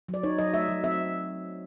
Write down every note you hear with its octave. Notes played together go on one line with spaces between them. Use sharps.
F#3
D5
D#4 C#5
F#3 D#5
A3 E5
F#3
C4 E5